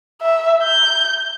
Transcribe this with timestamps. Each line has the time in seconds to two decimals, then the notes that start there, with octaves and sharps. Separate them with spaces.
0.21 E5
0.63 G6